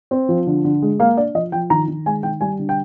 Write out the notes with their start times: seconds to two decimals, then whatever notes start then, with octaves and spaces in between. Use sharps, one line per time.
0.11 C4
0.29 F3
0.47 D3
0.64 D3
0.82 G#3
1.00 A#3 F5
1.17 D4 D5
1.35 F3 D#5
1.52 F3 G5
1.70 D#3 A#5
1.88 D#3
2.06 G#3 G#5
2.23 D#3 G5
2.41 G3 G#5
2.59 D3
2.69 G5